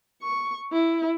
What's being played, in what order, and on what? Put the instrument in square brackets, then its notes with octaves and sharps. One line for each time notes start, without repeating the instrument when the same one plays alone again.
[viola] C#6
E4